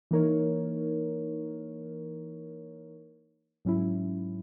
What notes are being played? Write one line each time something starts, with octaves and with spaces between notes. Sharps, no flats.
E3 A#3 D#4 A#4 C#5
G#2 F#3 C#4 E4